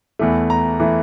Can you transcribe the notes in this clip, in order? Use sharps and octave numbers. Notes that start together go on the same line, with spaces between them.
E2 E3 A3
A#5
E3 A3